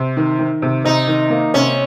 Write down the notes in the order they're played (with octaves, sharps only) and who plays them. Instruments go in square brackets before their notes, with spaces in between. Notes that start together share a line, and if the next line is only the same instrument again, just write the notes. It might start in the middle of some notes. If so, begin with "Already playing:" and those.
Already playing: [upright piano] C3
D#3
D#3
C3
[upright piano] C3 [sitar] D#4
[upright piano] D#3
A#3
[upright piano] C3 [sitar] C#4